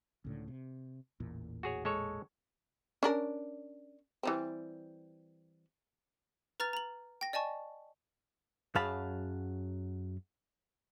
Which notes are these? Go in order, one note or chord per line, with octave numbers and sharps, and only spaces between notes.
C#2 A2 D3
C3
A1 E2 A#2
F#4 G#4 C#5
G#3 A4 C#5
C#4 D4 A#4
E3 G3 C4
B4 A#5 F6 A6 F7
A#5 F#7
G5 A#6
D5 D#5 G#5 A5 C#6
F#2 F#3 G#4 F5 A5 B5